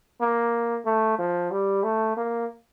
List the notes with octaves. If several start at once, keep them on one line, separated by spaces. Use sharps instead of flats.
A#3
A3
F3
G3
A3
A#3